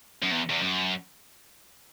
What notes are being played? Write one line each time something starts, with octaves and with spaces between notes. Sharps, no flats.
F#2
E2
E2
F#2